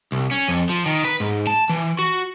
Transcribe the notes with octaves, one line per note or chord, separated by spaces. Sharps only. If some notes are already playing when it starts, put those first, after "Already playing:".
C2
C#4
F2
F3
D#3
B4
G#2
A5
E3
F#4